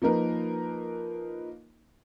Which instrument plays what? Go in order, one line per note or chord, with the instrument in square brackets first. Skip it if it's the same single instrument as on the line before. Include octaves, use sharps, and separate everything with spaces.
[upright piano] F3 A#3 D#4 A#4 B4